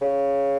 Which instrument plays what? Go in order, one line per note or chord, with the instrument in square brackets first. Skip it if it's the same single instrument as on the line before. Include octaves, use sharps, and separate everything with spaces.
[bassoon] C#3